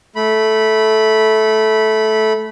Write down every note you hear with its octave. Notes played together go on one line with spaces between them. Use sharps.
A3 B5